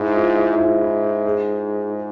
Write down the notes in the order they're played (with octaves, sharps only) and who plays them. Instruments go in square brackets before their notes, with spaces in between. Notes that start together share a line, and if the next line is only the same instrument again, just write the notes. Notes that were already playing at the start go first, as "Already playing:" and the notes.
Already playing: [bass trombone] G#2 [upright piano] E4
[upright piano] F4
E4
E4
[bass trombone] G#2 [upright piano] F4
[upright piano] E4
G#4